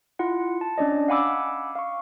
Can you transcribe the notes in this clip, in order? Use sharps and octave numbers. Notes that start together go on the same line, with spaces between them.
E4 F4 F#5
A5
C#4 D4 D5 D#5
F5 F#5 G#5 B5 D6 E6
F5 C#6